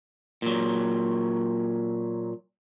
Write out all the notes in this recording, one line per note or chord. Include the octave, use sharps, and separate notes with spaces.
A#2 F#3